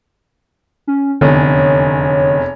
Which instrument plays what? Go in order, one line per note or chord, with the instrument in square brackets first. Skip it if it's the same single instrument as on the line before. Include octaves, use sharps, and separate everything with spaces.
[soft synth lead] C#4
[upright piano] F1 E2 [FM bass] D3 [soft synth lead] C#5